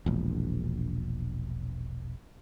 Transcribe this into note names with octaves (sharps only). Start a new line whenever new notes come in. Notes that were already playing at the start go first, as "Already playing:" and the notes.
E1 A#1